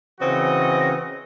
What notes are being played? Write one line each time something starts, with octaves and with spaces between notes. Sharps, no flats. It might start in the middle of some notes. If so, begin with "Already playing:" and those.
C#3 E3 C4 F#4 D#5